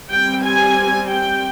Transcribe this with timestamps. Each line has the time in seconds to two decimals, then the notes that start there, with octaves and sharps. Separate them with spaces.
0.12 G3 C4 G5
0.44 G#5
1.09 G5